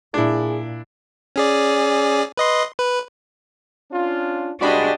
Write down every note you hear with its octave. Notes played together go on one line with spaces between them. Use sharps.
A#2 D4 E4 G#4
C#4 G#4 D5
B4 D#5 C6
B4
C#4 D4 F4
C2 G#3 D4 F#4 G4 D5 D#5 B5